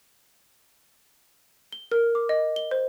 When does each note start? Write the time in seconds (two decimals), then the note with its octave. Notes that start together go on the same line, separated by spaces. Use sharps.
1.72 G7
1.92 A#4
2.15 D6
2.29 D#5
2.56 G7
2.71 C5